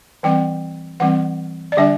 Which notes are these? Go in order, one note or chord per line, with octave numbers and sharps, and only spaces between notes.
E3 G3 C4 G5
E3 G3 C4 F#5
D5
D3 G3 D4 E5